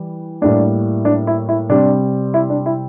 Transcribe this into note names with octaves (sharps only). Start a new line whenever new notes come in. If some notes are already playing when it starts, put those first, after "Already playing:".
Already playing: E3 G3
A2 G3 A#3 D4
D4
E4
E4
C3 G3 C4 D4
E4
D4
E4